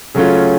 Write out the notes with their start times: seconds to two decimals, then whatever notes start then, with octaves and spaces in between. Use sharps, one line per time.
0.15 C#3 F#3 A3 C#4 F4